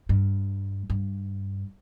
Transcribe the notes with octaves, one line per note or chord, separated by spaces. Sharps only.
G2
G2